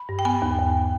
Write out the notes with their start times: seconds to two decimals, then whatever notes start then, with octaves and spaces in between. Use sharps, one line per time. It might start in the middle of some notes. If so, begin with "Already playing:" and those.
Already playing: B5
0.09 G2
0.19 G5
0.25 B3 G#5
0.42 D#2
0.59 D#2